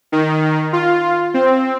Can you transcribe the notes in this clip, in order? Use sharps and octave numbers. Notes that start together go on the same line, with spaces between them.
D#3
F4
C4